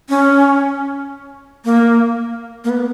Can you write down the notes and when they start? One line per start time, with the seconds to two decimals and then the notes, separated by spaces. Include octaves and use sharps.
0.09 C#4
1.65 A#3
2.64 A#3
2.70 B3